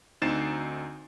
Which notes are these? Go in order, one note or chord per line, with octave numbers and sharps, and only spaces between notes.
D2 C4 D#4 A6 C7 E7